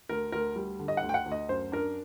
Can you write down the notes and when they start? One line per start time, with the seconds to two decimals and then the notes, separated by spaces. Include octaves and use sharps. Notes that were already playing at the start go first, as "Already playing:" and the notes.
0.09 D2 A#4
0.32 D2 A#4
0.56 G3
0.79 D3
0.88 D#5
0.97 F#5
1.02 D2
1.09 G5
1.14 F#5
1.26 D2
1.32 D#5
1.49 F#2 C5
1.72 D4 A#4